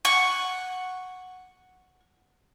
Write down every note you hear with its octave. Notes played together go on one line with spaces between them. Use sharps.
F#5 C#6